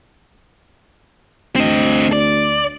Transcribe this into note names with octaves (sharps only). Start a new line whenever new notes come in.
D2 C4 D#5
D5